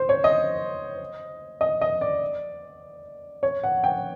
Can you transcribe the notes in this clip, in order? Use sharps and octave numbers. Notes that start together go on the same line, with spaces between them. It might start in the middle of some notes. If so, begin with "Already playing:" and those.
Already playing: C5
C#5
D#5
D#5
D#5
D5
C#5
F#5
G5